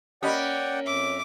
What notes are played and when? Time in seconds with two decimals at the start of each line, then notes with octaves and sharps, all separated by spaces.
0.23 A#3 C#4 G4 D5 D#5 F#5 G5 B5
0.86 F2 E5 D6